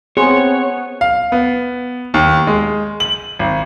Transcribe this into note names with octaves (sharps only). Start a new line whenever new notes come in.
B3 C4 G#4 C#5 C6
F5
B3
D#2
G#3
F#7
G#1